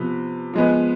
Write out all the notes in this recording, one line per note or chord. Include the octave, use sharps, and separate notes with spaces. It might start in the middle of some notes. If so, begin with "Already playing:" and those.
Already playing: C3 F3 B3
F3 G#3 B3